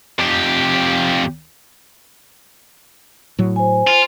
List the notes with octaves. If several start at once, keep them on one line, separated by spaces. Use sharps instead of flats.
F2 G4
A2 F#3
C5 G#5
F4